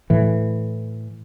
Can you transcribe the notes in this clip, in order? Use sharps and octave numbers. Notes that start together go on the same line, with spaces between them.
A2 E3